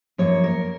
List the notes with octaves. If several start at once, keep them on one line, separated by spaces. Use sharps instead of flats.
F#2 F3 A#3 C#5
A#4